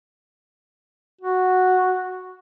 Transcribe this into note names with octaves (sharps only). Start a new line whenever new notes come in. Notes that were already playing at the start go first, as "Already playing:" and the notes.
F#4